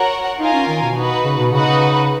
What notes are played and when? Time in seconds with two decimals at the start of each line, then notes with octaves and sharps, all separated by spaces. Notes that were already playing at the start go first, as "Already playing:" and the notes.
Already playing: F#4 A#4 C#5 F#5
0.39 D#4 F4 A#4 F5 G#5
0.53 C#4
0.68 D#3
0.82 B2
0.96 D#4 F#4 B4
1.25 C#3
1.38 B2
1.52 C#3 D#4 F#4 B4 D#5 F#5
1.66 C#3